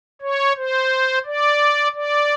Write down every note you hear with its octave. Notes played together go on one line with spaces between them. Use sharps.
C#5
C5
D5
D5